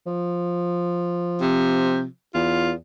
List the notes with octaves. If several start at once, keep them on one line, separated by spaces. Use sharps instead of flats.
F3
C3
E2 F4